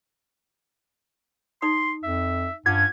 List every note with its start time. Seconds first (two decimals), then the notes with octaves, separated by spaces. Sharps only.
1.62 D#4 D5 C6 D#6
2.04 F2 E5
2.66 G2 C#4 F4 F#5 D6 G#6